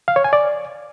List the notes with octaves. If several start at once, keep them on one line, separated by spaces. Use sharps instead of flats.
F5
C#5
G#5
D5